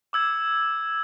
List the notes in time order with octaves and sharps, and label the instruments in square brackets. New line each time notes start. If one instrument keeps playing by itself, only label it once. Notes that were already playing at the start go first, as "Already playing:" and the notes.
[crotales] D6 E6 G#6